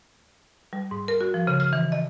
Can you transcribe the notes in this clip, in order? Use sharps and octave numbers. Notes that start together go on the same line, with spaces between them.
G3
G#2
A#4
F#4
F3
C#3
F6
E3
D#5